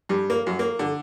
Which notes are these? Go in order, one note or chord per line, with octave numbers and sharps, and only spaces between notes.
G2
A#3
F#2
A#3
D3